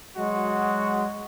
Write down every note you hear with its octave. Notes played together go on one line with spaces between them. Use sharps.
F#3 G#3 F#4